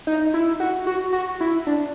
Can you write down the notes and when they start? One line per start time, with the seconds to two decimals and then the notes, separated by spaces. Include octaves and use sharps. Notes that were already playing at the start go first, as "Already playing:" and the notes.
0.07 D#4
0.34 E4
0.60 F#4
0.87 F#4
1.13 F#4
1.41 E4
1.67 D4